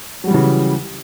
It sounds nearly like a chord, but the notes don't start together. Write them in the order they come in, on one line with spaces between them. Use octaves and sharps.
F#3 G3 E3 C#3